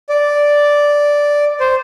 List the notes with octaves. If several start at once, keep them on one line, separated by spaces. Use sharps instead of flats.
D5
C5